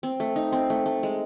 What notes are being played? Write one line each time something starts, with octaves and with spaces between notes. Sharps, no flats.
C4
A3
D#4
C4
A3
A3
G#3